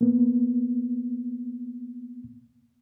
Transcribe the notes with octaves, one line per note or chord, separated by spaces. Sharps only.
A#3 B3